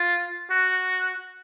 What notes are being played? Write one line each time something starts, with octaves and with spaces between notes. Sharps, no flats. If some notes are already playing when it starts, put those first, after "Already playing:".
Already playing: F4
F#4